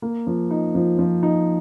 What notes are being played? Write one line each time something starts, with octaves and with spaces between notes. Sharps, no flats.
A#3
F3
D#4
F3
F3
D#4